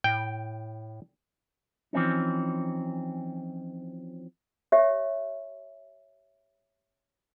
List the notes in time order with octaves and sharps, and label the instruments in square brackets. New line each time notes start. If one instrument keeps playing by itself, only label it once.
[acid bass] A2 [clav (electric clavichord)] G5
[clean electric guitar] E3 F3 C4 C#4 D#4
[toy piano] G4 C#5 E5